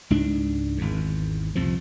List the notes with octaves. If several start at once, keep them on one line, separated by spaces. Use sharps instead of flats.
C#2 G#2 D4
G#1 E2
C2 F2 A#2 F3